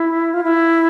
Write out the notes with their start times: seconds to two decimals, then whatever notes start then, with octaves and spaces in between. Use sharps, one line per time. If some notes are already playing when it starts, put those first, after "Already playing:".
Already playing: E4
0.34 F4
0.44 E4